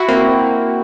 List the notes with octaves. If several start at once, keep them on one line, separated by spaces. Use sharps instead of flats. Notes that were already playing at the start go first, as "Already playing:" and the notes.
Already playing: E4 F#4
A#3 C4